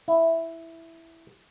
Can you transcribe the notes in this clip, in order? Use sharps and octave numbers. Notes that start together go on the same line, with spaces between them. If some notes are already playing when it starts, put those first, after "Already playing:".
E4